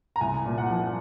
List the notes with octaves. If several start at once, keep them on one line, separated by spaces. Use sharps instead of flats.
A#5
C2 G#5
A#2
F#5
F3